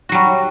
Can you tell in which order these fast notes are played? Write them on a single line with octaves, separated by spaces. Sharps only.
F#4 F#3 G3